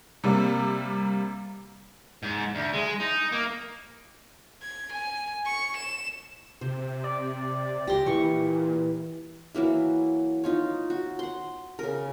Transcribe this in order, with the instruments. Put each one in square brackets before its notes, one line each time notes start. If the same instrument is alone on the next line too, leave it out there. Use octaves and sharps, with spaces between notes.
[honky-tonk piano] C3 G3 A#3
[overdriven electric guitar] G#2
D2
G#3
D#4
A#3
[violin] G#6
G#5
C#6
E7
[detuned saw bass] C3 [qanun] C5
[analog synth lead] D5
[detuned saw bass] C#2 [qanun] G4 C6 [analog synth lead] A#6
[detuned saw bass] A#2 [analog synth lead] E3 [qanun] C#6
[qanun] E3 F#3 A#3 E4
D#4 F4 C#5
F#4
F#5 C6
C#3 A#4